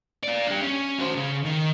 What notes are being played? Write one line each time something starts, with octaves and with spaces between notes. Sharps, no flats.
F4 D5
D4 G4
C#4
F#4 C5
C#3
D#3